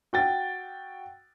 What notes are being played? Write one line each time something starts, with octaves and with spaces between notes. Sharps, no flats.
F#4 G5 A6